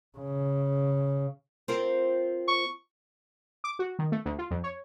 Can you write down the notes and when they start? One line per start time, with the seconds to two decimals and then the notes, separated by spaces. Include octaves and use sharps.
0.18 C#3
1.68 C4 F4 A#4
2.48 C#6
3.64 D6
3.79 F#4
3.99 D#3
4.12 A3
4.26 D2
4.38 F4
4.51 F2
4.64 C#5